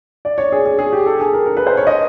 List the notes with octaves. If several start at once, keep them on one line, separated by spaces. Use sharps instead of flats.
D5
C#5
G#4
G#4
G#4
G4
A4
G#4
A#4
A#4
B4
C5
C#5
D#5